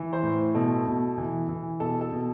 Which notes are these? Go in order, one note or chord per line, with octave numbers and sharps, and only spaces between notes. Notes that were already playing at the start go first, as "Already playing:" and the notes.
Already playing: E3
C5
A2
B2 A4
B2
E3
E3
B2 A4
A4
B2